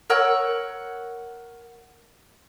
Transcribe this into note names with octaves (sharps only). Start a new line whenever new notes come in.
A#4 C#5 F#5 E6